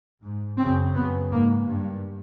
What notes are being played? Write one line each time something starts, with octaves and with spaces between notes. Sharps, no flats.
G#2
F#2 C#3 C4
F#2 C#3 B3
G#2 A#3
G2